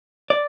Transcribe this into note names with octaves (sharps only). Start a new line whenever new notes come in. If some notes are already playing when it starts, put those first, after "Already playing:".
D5